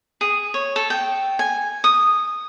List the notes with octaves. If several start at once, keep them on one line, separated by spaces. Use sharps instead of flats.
G#4
C#5
A4
G5
G#5
D#6